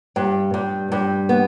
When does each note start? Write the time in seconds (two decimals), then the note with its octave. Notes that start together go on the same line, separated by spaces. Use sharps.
0.16 G2
0.54 G2
0.92 G2
1.29 B3